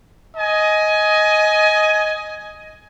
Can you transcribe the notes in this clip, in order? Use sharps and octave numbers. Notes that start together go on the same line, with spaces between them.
D#5 G#5